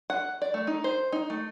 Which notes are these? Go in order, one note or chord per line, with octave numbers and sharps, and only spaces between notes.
F#5
D5
A3
D#4
C5
D#4
A3